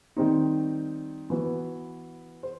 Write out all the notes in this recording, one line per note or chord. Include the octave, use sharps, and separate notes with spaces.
D#3 G3 C4 D#4
E3 B3 F#4 B4
C5